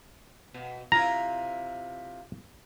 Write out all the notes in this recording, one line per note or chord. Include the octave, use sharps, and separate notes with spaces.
B2
C3 E4 F4 A#5